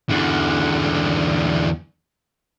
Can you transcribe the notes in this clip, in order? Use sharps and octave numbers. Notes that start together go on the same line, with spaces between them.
E2 D3